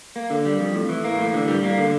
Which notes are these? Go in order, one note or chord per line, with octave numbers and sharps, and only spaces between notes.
A#3
D3
G3
F2
A2
E3
A#3
A2
D3
G3
A#3
D3